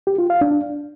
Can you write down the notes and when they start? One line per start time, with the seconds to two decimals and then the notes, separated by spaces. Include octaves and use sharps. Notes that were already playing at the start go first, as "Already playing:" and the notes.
0.07 G4
0.18 F4
0.30 F5
0.41 D4